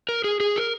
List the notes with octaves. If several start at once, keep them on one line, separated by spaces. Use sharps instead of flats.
A#4
G#4
G#4
A#4